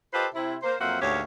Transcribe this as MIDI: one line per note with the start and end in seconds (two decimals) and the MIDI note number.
0.13 0.27 65
0.13 0.27 67
0.13 0.27 69
0.13 0.27 71
0.13 0.27 72
0.13 0.27 75
0.35 0.57 48
0.35 0.57 64
0.63 0.76 58
0.63 0.76 72
0.80 0.99 41
0.80 0.99 54
0.80 0.99 58
0.80 0.99 72
0.80 0.99 76
0.80 0.99 78
1.02 1.21 38
1.02 1.21 44
1.02 1.21 58
1.02 1.21 67
1.02 1.21 73